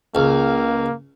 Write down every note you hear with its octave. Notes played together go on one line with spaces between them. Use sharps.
C#2 A#3